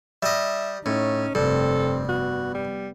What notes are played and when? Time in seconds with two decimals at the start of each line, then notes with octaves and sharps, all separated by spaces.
0.23 G3 D#5 E5
0.86 A2 C#4 D#4
1.35 F1 G2 C4 A4
2.09 B3 F#4
2.55 G3